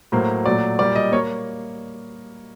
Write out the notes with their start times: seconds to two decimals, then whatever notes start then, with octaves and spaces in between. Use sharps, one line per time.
0.12 A2 F#3 A#3 C5
0.45 A#2 F#3 A3 D5
0.79 A#2 G3 A#3 D5
0.95 D#5
1.12 A#3 C#5